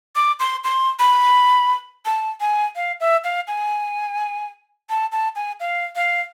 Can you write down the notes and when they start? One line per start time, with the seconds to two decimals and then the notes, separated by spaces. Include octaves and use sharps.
0.16 D6
0.40 C6
0.64 C6
0.99 B5
2.05 A5
2.40 G#5
2.76 F5
3.00 E5
3.24 F5
3.47 G#5
4.90 A5
5.12 A5
5.36 G#5
5.60 F5
5.96 F5